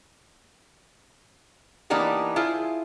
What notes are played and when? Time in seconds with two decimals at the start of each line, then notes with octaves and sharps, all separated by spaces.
1.90 E3 A#3 B3 D4 D#4 G4
2.36 E4 F4 G#4 C5